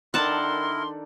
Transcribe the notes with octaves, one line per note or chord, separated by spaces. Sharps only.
D#3 D4 E4 A4 A#4 F#5 A5 C6